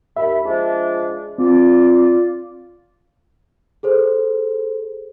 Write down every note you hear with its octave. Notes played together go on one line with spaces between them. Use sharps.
D#2 E5 B5
F3 G#3 D4
C4 F4 D5
G#4 A4 C5